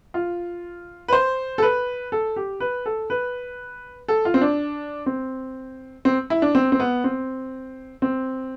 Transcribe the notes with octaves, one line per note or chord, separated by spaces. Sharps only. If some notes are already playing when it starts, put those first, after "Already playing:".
F4
B4
C5
A4
B4
A4
G4
B4
A4
B4
A4
F4
C4
D4
C4
C4
E4
D4
C4
C4
B3
C4
C4